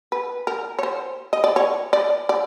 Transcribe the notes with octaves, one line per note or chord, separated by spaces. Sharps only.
B4
A#4
C#5
C5
D#5
D5
C#5
D5
D5